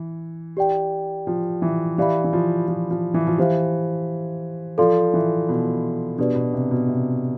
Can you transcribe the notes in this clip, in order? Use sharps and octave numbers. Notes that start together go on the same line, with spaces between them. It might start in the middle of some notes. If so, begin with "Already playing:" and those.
Already playing: E3
G4 D5 G5
F3
E3
E3 G4 D5 F5 B5
E3
F3
F3
F3
E3
F3
E3 G4 C5 F5
F3 A4 D5 F5 C6
E3
B2
B2 D4 G4 B4 D5
B2
C3
B2
C3